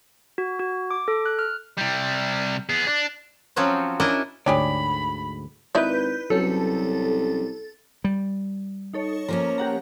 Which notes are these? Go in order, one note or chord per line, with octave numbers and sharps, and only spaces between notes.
F#4
F#4
D6
A4
F#6
F6
C3 G3
B3 G#4
D4
F3 F#3 C4 C#4 F4 F#4
C#4 D4 E4 A#4 D#5
D2 G#2 D4 G4 G#4 C#5 D5 B5
G#1 D#4 E4 B4 D5 G6
C2 F#3 C#4 A4
G3
D#4 A4 C#5
F3 A#3 C#4 A#5
G4 F#5 A#5